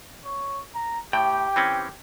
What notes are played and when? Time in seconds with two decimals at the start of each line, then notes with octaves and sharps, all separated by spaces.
0.25 C#5
0.75 A#5
1.13 A2 G4 G5
1.56 E3 C4 C#4